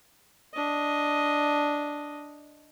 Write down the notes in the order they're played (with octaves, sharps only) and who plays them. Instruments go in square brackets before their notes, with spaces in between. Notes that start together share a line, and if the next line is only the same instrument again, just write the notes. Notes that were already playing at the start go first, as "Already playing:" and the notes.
[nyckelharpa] D4 D#5